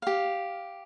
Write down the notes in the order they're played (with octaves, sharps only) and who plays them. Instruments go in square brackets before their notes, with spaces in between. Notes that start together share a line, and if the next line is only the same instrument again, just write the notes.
[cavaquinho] G4 F5